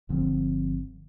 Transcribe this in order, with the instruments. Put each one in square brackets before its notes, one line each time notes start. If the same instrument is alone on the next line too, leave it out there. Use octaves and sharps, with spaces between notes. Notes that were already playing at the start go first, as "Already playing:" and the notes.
[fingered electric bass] G1 D3 F3 C4